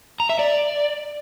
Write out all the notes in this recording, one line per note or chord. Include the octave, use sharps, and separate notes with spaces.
A#5
E5
D5